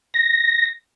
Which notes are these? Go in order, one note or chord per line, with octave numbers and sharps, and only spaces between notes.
A#6